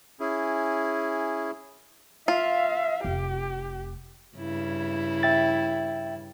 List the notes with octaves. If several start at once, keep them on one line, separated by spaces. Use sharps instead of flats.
C#4 E4 G#4
F4 E5 F5
F1 G4
G2 C#3 E4
E5 G5 A6